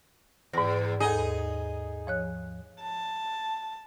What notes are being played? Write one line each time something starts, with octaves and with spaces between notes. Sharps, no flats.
E2 G#2 A#6
D#2 D#4 G#4 A4 D#5 G#5
F3 C#5 F#6
A5